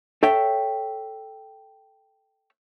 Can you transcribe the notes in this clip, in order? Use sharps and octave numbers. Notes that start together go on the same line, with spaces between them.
A4 C#5 E5 G5